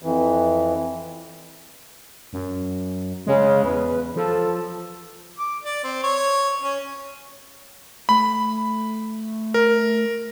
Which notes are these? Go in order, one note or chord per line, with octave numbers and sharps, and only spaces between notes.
F2 E3
F#2
C#3 G#3
E2 B4
F3 A4
D6
D5
C4
C#5
C#4
A3 B5
A#4